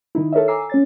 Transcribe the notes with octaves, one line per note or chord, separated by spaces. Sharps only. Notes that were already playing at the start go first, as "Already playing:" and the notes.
D#3 D#4 E4
A4 A#4 C#5 D#5 E5
G#5 A#5 D6 E6 C7
C#4 C#5 A6